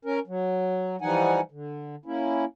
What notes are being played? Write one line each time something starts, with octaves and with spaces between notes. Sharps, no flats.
C#4 A#4
F#3
E3 F3 G3 D#4 F#5 G#5
D3
A#3 C#4 E4